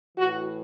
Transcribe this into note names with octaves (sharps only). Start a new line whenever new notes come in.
A2 E3 F#4